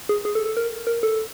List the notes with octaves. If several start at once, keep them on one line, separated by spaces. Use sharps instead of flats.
G#4
G#4
A4
A4
A#4
A#4
A4